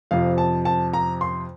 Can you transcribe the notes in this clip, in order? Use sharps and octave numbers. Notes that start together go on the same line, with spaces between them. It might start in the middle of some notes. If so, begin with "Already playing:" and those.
F2 C3 F3 F5
A5
A5
A#5
C6